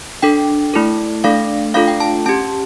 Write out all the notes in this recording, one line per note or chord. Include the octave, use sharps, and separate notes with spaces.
D4 A4 G5
A3 E4 A4
A3 D4 A4 F5
A3 D4 F4 A4 F5
G5
A5
C#4 G4 A5